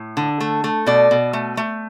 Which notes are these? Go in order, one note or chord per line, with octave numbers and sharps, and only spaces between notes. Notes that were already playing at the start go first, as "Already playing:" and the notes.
Already playing: A2
D3
A3
A3
B2 D5
B2
A3
A3